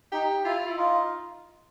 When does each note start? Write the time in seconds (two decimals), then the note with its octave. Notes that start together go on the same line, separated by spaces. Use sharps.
0.12 D#4 G4
0.45 E4 F4
0.67 E4
0.77 D#4 F4